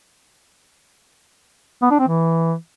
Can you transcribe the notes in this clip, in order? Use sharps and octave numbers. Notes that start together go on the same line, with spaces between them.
B3
D4
C4
E3